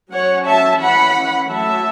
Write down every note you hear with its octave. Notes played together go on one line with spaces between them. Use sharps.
F#3 C#4 C#5 F#5
E5 A5
E3 C#4 F#5 B5
F#3 A3 C#4 E5 A5